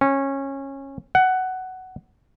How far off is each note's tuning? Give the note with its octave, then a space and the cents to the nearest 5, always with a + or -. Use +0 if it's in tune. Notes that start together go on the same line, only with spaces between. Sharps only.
C#4 -20
F#5 +10